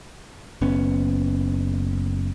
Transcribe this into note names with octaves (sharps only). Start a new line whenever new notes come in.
F#1 B3 C#4